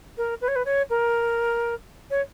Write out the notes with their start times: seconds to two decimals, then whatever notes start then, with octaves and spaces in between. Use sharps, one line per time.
0.18 A#4
0.41 B4
0.48 C#5
0.56 B4
0.65 C#5
0.90 A#4
2.10 C#5